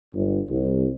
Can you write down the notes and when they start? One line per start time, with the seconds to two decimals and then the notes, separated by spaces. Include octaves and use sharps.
0.13 G1
0.49 C2